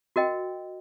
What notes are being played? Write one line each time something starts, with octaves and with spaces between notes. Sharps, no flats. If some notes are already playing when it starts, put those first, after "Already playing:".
F#4 A#4 D#5 G5